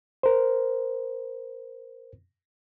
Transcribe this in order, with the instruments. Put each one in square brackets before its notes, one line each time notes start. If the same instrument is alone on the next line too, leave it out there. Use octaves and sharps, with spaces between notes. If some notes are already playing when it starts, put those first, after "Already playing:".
[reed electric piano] A#4 C5